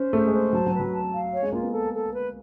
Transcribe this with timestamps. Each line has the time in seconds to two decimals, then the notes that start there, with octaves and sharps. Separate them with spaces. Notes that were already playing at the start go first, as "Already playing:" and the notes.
Already playing: C#4 C5
0.13 A3 G#4
0.27 G#3
0.33 C5
0.53 F#3 A5
0.66 F#3
0.74 B4
0.80 F#3
0.92 A5
1.13 F5
1.33 C#5
1.43 G#3
1.52 A#3 F4
1.62 B3
1.73 A4
1.93 A4
2.13 B4